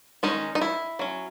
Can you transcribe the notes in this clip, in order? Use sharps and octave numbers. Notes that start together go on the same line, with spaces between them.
D#3 G#3 C#4 D#4
D#4
E4
F#3 C#4